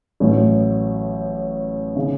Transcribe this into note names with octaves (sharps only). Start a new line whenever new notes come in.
A1 A2 F#3
C#3